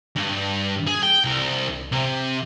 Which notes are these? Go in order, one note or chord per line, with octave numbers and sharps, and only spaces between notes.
G2
G#4
G5
C2
C3